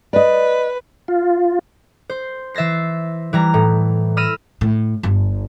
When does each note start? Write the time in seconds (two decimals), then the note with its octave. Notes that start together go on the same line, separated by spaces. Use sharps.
0.13 B4 D5 D#5
1.08 F4
2.10 C5
2.54 E3 E5 A6 A#6 C7
3.33 E3 G3 A#5
3.54 A2
4.17 B5 E6 F6 A#6 D#7 E7
4.61 A2
5.03 G1